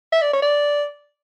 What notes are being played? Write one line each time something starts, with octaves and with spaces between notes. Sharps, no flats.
E5
D5
C#5
D5